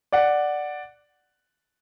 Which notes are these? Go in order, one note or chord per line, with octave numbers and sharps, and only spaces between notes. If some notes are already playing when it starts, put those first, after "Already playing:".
D5 F#5